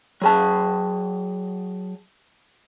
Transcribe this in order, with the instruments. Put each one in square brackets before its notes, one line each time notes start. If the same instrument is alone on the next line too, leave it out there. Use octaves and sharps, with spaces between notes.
[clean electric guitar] F#3 G#4 A5